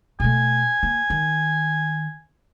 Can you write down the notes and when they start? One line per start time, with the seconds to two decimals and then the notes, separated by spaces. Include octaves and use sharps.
0.20 B2 A3 G#5
0.83 A#3
1.10 D#3